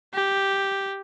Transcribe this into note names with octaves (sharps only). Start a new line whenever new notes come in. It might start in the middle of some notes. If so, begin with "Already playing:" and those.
G4